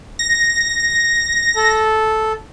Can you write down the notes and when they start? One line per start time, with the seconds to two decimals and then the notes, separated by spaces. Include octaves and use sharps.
0.19 A#6
1.56 A4